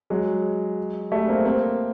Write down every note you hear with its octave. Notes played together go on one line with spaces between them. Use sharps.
F#3 G#3
G3 A3
A#3 C4
A#3 C4